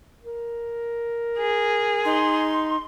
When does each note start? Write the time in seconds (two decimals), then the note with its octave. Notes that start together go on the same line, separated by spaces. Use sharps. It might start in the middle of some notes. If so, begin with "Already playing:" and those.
0.23 A#4
1.38 G#4
2.05 D#4 C6